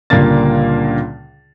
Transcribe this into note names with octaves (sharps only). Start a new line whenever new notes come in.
C#2 A#2 D3 G3 A#3 A6